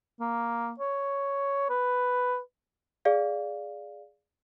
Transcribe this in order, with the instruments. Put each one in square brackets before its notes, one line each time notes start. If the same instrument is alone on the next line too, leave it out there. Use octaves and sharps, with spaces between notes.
[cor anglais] A#3
C#5
B4
[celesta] G#4 D5 F5